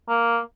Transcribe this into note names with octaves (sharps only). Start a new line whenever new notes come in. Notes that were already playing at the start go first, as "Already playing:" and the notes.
A#3